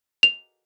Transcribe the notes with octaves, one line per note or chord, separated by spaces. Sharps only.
F7